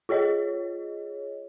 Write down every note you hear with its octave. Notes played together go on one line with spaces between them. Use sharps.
F4 G#4 C#5 D#5